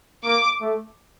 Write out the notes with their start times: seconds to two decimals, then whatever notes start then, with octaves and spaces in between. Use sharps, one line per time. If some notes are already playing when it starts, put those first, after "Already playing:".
0.24 A#3 D6
0.61 A3